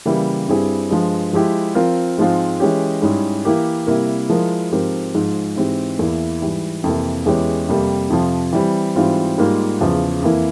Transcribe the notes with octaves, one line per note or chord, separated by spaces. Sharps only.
C#3 E3 G3 A#3 E4
G2 G3 C4 E4 G#4
G2 F3 G#3
F3 G#3 E4 G4
F3 C4 F4 A#4
G#2 F3 G#3 C4 F4
E3 G#3 C#4 G4
G#2 G3 C#4 E4 G#4
E3 A#3 E4 G4 A#4
C3 G3 A#3 E4 A#4
F3 G#3 E4 A#4
G#2 F3 C4 G4 A#4
G#2 F3 G#3
G#2 E3 G#3 C4 G4
E2 E3 A#3 E4
G#2 E3 G3
F2 C3 E3 A#3
E2 E3 G#3 C#4 G4
F2 C3 G3 A#3
F2 C3 F3
E3 G3 C4
G#2 E3 G3 C4 F4
G#2 G3 A#3 F4 A#4
E2 C#3 F3
F2 E3 A#3 E4